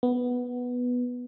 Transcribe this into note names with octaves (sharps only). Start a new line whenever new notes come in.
B3